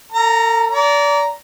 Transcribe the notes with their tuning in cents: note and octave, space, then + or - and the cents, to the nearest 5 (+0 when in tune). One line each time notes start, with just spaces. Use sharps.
A4 +45 A#5 +0
D5 -30 A#5 +0